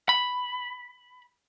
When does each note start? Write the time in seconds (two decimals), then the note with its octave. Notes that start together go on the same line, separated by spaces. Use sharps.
0.09 B5